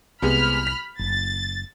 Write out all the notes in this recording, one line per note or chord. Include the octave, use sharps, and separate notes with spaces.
C2 C3 G#3 B3 B5 F6
B6
F#1 A6